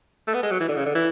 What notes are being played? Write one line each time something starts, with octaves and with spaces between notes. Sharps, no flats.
A3
B3
G#3
F#3
E3
D3
C#3
D3
E3